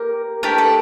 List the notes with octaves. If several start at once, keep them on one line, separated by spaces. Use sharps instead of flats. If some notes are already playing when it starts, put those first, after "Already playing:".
Already playing: A#3 G4 A#4
A3 D4 G4 A#4
A4